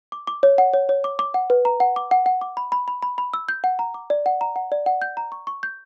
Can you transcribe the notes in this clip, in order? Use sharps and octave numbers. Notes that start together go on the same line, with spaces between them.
D6
D6
C#5
F#5
C#5
C#5
D6
D6
F#5
B4
A#5
F#5
D6
F#5
F#5
D6
B5
B5
B5
B5
B5
E6
G6
F#5
A#5
D6
D5
F#5
A#5
F#5
D5
F#5
G6
A#5
C#6
C#6
G6